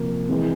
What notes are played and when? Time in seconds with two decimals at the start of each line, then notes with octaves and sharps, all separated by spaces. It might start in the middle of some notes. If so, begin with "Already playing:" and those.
Already playing: C3 F3 A#3
0.29 E3 G#3 C4